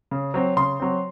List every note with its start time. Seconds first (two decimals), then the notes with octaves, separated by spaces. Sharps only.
0.11 C#3
0.34 F#3 C4
0.57 C#3 C6
0.80 F#3 C4